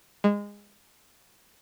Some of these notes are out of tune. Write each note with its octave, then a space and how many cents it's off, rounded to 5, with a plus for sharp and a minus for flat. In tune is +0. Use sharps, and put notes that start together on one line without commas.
G#3 -20